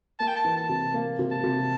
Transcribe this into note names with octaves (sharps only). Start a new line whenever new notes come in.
A#3 A5
G5
A5
E3
A5
C3
A#3
C3
A5
C3